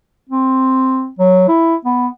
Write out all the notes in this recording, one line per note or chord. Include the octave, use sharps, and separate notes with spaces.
C4
F#3
E4
B3